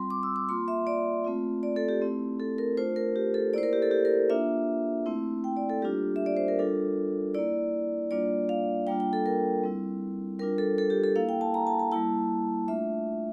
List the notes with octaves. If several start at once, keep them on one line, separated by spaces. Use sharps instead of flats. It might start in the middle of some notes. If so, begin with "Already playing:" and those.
Already playing: G3 C4 F4 C6
D6
E6
D6
A#3 F4 C6
E5
D5
A3 C4 F4
D5
A4
G4
A3 C4 E4
A4
A#4
A3 D4 F4 C5
A#4
G4
A4
A#3 E4 C5 D5
A#4
G4
A4
G4
A#4
A#3 D4 F4 E5
A3 C4 E4
G5
D5
A4
G3 A#3 D4 F4 G4
E5
D5
C5
A#4
G3 D4 F4 A4
A#3 E4 D5
G3 A#3 D4 F4 D5
F5
G3 A#3 D4 F4 G5
G5
A4
A#4
G3 C4 E4
G3 D4 F4 A#4
A4
A4
G4
A4
A#3 E4 F5
G5
A5
A#5
A5
A5
G3 A#3 E4 A5
A3 D4 F4 E5